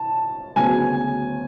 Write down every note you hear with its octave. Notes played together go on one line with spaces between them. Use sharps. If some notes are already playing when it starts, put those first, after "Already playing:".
Already playing: A5
D2 C#3 F#3 B3 G#5